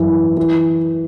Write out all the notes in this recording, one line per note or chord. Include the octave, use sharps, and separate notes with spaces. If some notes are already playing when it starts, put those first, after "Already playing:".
Already playing: F#2 E3
E3